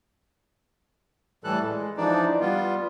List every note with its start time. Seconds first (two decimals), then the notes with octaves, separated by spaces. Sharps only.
1.44 A2 E3 G3 A4 F#6
1.69 G#3
1.97 E3 F3 D4 D#4 D5
2.41 G3 B3 F4